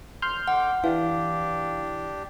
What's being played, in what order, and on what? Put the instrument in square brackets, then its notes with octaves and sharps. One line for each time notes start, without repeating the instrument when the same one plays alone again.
[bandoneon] D3 F3 [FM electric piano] C6 F6 G6
[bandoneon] D3 D6 [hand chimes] F#5
[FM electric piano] E3 [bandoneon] D4 G4 [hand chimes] F5